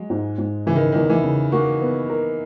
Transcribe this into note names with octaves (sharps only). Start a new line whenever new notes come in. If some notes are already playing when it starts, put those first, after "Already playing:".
Already playing: F#3 G#3
G#2
G#2
C#3 E3
D#3
D#3
E2
E3
C#3
A#3 F#4
B3
A#4